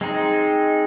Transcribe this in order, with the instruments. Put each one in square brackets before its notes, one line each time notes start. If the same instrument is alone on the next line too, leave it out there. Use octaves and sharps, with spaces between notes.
[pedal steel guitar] G#3 C4 D#4